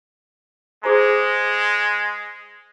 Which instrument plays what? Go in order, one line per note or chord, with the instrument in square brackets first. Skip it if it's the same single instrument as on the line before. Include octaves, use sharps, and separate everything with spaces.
[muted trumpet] G#3 [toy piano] G#4 C5 A#5